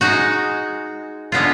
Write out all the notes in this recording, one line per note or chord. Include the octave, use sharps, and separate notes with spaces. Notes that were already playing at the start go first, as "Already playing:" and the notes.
G#3 D#4 F#4
D3 G#3 B3 F4